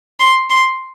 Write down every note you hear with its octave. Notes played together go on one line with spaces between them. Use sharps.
C6
C6